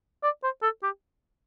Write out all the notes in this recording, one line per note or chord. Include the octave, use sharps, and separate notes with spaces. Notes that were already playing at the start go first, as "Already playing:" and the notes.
D5
C5
A4
G4